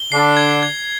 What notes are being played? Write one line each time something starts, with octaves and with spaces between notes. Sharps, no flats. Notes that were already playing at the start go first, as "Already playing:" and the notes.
Already playing: G7
D3 D4 C7
G#6
G#6